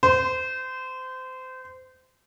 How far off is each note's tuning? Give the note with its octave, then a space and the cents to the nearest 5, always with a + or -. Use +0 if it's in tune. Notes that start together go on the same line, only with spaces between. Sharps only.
C5 -25